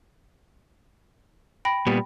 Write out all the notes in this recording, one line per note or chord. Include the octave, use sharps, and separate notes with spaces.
G5 B5 A#6
A#2 G3 B3